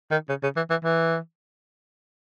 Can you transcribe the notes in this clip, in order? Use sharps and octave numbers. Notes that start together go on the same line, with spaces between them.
D#3
C#3
C#3
E3
E3
E3